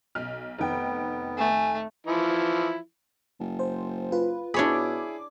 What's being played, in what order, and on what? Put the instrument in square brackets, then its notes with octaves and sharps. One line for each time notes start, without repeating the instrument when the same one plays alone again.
[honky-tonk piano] B1 F6
[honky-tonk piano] F1 D#3 G5 [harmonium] B3
[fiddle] A3 [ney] G#5
[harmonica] E3 F3 E4
[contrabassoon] F#1
[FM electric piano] C5
F4 B4
[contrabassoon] B2 [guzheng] D4 C#5 B5 [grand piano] E4 G#4 [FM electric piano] D6